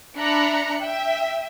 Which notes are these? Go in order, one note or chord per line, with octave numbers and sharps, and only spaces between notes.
D4 E5 A#5 B5 F#6 C#7
E5 G5